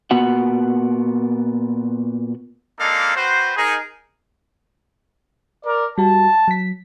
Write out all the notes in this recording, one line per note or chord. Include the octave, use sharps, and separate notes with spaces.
A#2 B3 F#4 F#5
G#3 A#3 D4 D#4 A4 F5
C4 F#4 B4 C5
D#4 G#4 A#4
A#4 D5
G3 F#4 A5
F#3 B6